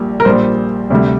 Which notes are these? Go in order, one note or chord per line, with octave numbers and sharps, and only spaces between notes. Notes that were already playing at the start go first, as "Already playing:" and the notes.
Already playing: A#1 A#2 G3
A#4
A#1 A#2 G3 C5
D2 C3 G3